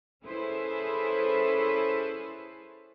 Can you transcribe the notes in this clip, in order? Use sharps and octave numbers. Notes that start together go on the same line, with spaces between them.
C#4 E4 G#4 A4 B4 C5